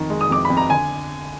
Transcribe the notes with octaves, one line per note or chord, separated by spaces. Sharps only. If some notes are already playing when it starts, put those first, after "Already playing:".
Already playing: F2 D#3
G#3
D#6
F2 D6
B5
F2
A#5
D3 G#5